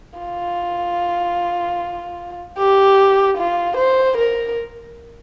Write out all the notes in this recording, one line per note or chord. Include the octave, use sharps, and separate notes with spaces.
F4
G4
F4
C5
A#4